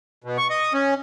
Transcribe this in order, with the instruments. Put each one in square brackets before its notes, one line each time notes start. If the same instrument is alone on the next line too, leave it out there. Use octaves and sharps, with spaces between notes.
[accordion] B2
C#6
D#5
C#4